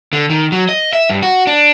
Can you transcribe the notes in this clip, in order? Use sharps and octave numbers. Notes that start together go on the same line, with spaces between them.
D3
D#3
F#3
D#5
E5
G2
F#4
D4